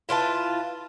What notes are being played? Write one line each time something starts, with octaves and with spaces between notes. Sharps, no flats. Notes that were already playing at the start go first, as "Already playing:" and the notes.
E4 F4 B4 A5